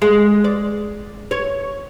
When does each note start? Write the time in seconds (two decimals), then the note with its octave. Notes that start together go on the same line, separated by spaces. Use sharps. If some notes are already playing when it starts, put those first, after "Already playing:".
0.02 G#3
0.44 D5
1.31 C#5